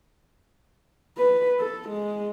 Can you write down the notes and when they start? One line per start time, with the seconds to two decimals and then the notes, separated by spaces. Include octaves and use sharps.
1.17 B4
1.59 A4
1.89 G#3